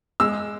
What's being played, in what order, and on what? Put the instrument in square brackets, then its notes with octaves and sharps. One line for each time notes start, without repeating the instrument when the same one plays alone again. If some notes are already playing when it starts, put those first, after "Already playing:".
[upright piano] G#3 E6